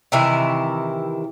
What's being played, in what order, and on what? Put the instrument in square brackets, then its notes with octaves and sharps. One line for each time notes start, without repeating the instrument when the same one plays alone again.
[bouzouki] C3 D#3 E3 E4